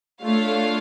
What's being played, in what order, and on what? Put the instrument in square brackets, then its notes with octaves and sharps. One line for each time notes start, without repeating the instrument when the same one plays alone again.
[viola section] A3 [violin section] D4 F4 C#5 F5